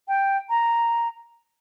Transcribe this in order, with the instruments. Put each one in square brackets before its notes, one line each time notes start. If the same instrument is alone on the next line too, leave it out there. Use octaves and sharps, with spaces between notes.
[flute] G5
A#5